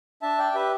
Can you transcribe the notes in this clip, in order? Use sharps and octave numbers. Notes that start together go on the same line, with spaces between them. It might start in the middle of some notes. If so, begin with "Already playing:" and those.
D4 E5 A5
D5 G5
G4 B4 E5